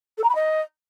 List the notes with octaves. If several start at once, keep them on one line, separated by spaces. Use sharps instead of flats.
A4
A#5
B5
D#5